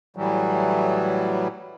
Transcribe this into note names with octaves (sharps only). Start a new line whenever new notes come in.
A2 E3 F#3 G3